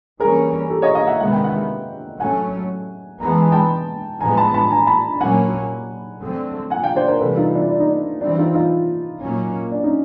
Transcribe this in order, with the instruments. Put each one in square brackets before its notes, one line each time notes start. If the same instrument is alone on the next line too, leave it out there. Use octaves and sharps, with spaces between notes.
[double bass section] E3 G3 A#3 C#4 [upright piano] G#4 A#4
[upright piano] G4 A4
C#5 D#5
D#5 F5
E5 F#5
[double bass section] C3 D#3 G#3 B3 [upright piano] F#5
[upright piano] G5
E5 F#5
[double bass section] A2 F#3 A3 C#4 [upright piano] F#5 G#5
[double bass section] E3 G#3 B3 [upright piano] A#5
[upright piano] A5
G#5
G5 A5
[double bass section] A2 F3 G#3 B3 [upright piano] G#5 A#5
[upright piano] A5 B5
A5 B5
G#5 A#5
A5 B5
[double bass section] A#2 F#3 A#3 C#4 [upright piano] F#5 G#5
[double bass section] D3 F#3 A3 C4
[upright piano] F#5 G#5
F5 G5
C5 D5
A#4 C5
[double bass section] C3 E3 G3 [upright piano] A4 B4
[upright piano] D#4 F4
D4 E4
D4
D#4
D4
[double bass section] E3 G3 C4 [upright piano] D4 E4
[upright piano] D#4 F4
D#4 F4
[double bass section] A#2 F#3 A#3 C#4
[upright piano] D4
C#4 D#4